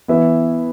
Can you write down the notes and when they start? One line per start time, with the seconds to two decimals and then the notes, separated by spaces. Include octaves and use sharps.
0.08 E3 B3 E4 E5